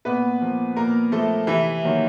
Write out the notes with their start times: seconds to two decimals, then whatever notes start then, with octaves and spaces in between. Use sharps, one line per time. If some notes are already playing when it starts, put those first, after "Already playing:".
0.05 A#2 B3 B4
0.41 F3 A#3
0.76 A#2 A#3 A#4
1.12 F3 A3 A#3 A4
1.47 C3 E3 E4
1.83 D#3 F#3 A#3